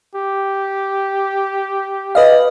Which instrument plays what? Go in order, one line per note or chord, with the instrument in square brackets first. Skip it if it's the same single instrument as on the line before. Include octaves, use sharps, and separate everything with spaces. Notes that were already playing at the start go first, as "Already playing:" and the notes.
[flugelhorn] G4
[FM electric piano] B4 D#5 F5